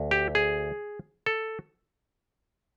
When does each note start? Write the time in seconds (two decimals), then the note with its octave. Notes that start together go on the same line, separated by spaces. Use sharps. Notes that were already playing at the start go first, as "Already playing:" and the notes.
Already playing: D2
0.11 G4
0.35 G#4
1.26 A4